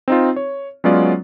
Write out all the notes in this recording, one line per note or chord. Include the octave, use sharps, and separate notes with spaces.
C4 D#4 F4
C#5
F#3 G#3 B3 C#4 F4 D5